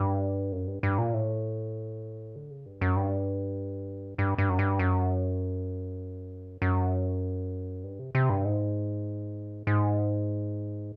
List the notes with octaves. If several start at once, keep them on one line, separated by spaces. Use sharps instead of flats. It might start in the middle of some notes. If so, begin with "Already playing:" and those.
Already playing: G2
F#2
G2
G2
A#2
A2
D3
C#3
G2
F#2
G2
G2
G2
F#2
G2
F#2
F#2
G2
C3
C3
G2
G#2
G#2